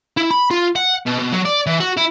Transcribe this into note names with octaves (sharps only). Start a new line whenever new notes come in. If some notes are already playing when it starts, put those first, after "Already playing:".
E4
B5
F4
F#5
B2
B2
F#3
D5
E3
F#4
E4